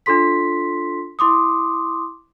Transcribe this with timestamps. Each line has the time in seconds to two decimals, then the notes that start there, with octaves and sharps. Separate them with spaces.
0.06 D4 F4 A4 C6 B6
1.19 E4 C6 D6 D#6